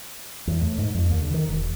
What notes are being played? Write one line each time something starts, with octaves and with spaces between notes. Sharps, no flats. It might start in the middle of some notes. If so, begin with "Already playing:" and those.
E2
A2
G#2
F2
D#2
D3
D#3
E1